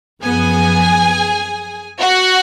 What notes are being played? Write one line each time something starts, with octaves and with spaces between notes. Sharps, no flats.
F#2 F3 B3 G#4 G#5
F#4 F#5